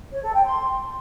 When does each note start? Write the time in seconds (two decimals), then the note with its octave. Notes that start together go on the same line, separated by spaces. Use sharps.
0.13 C#5
0.23 A4
0.34 G5
0.45 C6